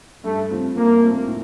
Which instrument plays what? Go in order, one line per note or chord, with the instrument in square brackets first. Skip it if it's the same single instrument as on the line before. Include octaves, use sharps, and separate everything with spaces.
[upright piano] G2 [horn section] A3
[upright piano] F3 A3 C4 F4
[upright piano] G2 [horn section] A#3
[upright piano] F3 A3 C4 F4
A2